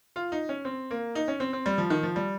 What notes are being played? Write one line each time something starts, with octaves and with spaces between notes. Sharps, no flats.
F4
D#4
C#4
C4
A#3
D#4
C#4
C4
C4
G3
F3
D#3
F3
G3